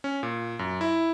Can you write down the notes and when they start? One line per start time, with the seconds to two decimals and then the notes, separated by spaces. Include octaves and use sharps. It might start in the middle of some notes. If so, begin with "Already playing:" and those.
0.04 C#4
0.23 A#2
0.59 F#2
0.81 E4